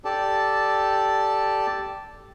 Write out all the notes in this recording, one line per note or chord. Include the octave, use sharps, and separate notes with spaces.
G4 A4 D5 A5